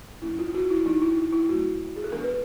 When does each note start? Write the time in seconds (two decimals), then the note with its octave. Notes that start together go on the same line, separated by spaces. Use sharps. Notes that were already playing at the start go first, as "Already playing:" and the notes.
0.22 F#3 A#3 C#4 E4
0.39 F4
0.55 F#4
0.70 E4
0.85 F3 A#3 D4 D#4
1.02 E4
1.17 E4
1.33 E4
1.48 F#3 A3 C#4 F#4
1.96 G#4
2.04 A4
2.12 E3 G#3 B3 D4 A#4
2.24 B4